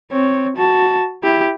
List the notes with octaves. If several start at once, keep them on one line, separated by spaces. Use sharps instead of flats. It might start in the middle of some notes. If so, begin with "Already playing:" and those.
C4 C#5
F#4 A5
E4 G4